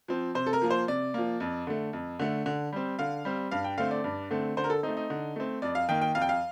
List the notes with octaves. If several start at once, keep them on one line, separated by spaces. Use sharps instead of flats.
F3 C4
C3 C5
A4
A#4
F3 A#3
C5
C3 D5
F3 A#3
F2
D3 A3
F2
D3 A3
D3
G3 C4
D3 F5
G3 C4
G2 F5
G5
D3 A3 C4 F5
D5
G2
D3 A3 C4
D3 C5
A#4
A4
A3 C4 D#4
D#4
D3
A3 C4
F2 D5
F5
D#3 A#3 G5
G5
F2 F5
G5
F5